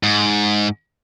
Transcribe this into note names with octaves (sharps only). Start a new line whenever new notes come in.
G#2